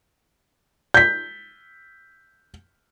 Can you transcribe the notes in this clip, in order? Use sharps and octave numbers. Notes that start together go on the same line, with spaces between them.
G6 B6